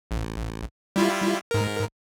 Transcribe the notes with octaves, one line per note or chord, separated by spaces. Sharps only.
A1
G3 E4 F4
G#2 A#4